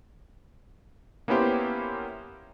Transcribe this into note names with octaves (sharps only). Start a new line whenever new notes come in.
A#3 B3 C#4 E4 G4 C5